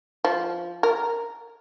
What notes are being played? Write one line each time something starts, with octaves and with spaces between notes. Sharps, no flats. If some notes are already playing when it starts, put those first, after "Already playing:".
F3
A#4